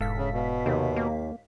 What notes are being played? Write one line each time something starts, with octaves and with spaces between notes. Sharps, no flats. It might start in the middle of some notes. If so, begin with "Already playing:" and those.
E1 G#2 A4 F5 B6
C#3
B2
D#2 C3
A#3